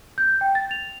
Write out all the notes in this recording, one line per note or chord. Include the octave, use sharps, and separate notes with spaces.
G6
G5
A6
F7